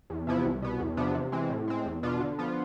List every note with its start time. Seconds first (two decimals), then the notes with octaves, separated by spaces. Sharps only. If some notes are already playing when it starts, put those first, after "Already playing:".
0.10 E2
0.27 C3 F3 B3 E4
0.45 C2
0.62 B2 B3
0.79 E2
0.97 C3 F3 B3 D4
1.15 C3
1.32 E3 G#3 C4
1.50 A2
1.68 G#3 C4
1.85 E2
2.03 B2 B3 D4 F4
2.21 D3
2.38 F3 B3 F4